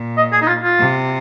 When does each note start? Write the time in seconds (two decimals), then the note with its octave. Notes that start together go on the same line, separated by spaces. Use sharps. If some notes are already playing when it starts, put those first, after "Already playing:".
Already playing: A#2
0.17 D#5
0.32 G#4
0.42 D#4
0.48 F4
0.63 F4
0.78 C3